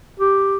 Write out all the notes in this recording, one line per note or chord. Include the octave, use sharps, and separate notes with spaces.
G4